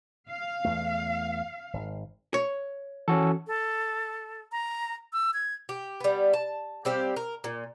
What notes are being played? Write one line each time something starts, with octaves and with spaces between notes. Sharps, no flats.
F5
E2 A3
G#1
C#5
E3 C#4 F#4 A4
A4
A#5
E6
G#6
G4
G3 B3
A5
G3 C4 G4 F5
A#4
A#2